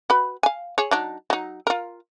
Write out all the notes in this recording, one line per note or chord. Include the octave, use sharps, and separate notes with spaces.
F#4 B4 B5
F5 G#5
G#4 C#5
F#3 D4 D#4
F#3 D#4
F4 A#4